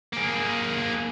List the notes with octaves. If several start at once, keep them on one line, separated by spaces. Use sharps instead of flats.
A#3 G#4